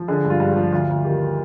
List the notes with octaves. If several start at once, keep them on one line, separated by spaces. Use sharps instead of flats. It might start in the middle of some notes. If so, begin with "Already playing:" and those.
Already playing: F3
D3 G#4
G2
F4
G2
F3 G4
D2 F4
D2
D#3 G4